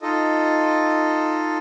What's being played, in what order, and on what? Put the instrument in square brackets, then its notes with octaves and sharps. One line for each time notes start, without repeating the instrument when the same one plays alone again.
[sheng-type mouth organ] D#4 F4 A4 D#5